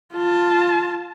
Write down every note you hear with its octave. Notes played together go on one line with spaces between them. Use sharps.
F4 A5